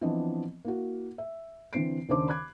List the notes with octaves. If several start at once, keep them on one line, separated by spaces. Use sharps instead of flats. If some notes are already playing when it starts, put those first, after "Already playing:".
E3 F3 B3 C4 D4 D#5
A#3 E4 F#4
E5
D3 E3 C4 C7 D7
D#2 C#3 D4 D#4 C5 D6
B5 D6 F#6 G#6